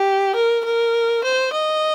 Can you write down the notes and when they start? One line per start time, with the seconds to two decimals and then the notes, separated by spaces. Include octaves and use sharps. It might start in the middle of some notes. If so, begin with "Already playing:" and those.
Already playing: G4
0.36 A#4
0.65 A#4
1.24 C5
1.53 D#5